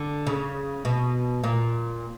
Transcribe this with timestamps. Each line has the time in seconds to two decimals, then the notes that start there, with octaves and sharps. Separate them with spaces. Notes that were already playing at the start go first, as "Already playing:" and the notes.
Already playing: D3
0.27 C#3
0.85 B2
1.44 A#2